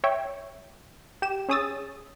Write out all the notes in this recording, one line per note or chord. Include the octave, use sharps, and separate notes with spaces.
C#5 E5 G5
G4 E7
C#4 G#4 C#5 D#6 E6 A6